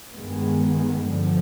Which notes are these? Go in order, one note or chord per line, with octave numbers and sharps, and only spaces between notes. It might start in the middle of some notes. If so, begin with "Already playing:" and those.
G2 D#3 G#3 B3
G2 D3 F3